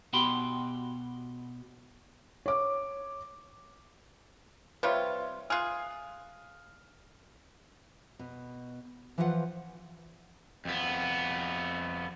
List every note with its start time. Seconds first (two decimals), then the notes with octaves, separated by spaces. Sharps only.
0.13 B2 F#4 G4 G5 B5 C6
2.46 C#5 D6
4.83 C3 G3 F4 B4 C#5 E5
5.50 F4 G#4 F6 F#6 C7
8.19 B2
9.18 E3 F3 F4 B4 E5 F#5
10.65 F2 B3